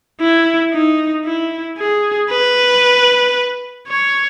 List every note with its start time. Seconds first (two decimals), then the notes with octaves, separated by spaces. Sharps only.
0.21 E4
0.73 D#4
1.25 E4
1.78 G#4
2.31 B4
3.88 C#5